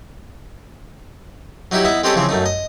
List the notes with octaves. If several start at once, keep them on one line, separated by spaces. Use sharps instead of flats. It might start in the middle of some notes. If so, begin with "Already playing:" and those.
F#3 D#4 E4 F#4 G4
B3 D#4 E4 E5
G#3 C4 C#4 G4 A4 D#5
C#3 E3 F3 C4
F#2 A3 D#4
D#5